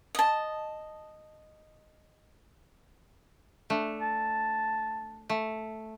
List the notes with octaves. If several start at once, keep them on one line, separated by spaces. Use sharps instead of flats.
D#5 A5
A3 D4
A5
A3